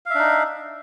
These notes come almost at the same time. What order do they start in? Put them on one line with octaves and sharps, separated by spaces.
F5 E5 D4 D#4